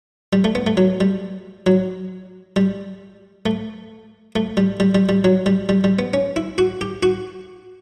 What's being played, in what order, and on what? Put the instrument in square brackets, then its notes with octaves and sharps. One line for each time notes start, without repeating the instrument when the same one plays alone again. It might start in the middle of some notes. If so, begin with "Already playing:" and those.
[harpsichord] G3
A3
B3
A3
F#3
G3
F#3
G3
A3
A3
G3
G3
G3
G3
F#3
G3
G3
G3
B3
C#4
E4
F#4
G4
F#4